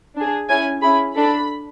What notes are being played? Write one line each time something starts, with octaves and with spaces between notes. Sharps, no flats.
D4 G#4
C#4 E4 G#4 G#5
C#4 E4 G#4 B5
D4 A4 B5